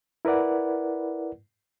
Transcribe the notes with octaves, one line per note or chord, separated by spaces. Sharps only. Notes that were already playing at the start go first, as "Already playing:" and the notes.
E4 A#4 B4 D5 F#5